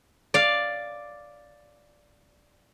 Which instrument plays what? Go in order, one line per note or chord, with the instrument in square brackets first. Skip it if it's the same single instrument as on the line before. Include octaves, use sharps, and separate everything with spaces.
[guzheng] D5 F5